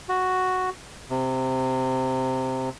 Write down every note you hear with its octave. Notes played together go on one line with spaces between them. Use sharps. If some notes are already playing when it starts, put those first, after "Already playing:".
F#4
C3